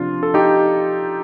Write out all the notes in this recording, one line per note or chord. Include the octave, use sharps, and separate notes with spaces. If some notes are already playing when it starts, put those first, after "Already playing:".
Already playing: C3 F3 D4 F4
A4
D#4 G4